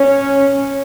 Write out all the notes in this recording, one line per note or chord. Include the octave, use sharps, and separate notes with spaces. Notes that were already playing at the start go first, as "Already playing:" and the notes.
Already playing: C#4